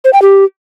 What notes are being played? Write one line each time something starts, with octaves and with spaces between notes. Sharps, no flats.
C5
G5
G4